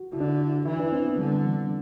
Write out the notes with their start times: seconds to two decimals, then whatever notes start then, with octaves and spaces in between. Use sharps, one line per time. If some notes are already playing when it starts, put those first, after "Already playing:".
Already playing: F#4
0.13 D3 E4
0.21 D4
0.28 E4
0.66 E3 E4
0.80 D4
0.93 C4
1.05 B3
1.19 D3 G3
1.45 E3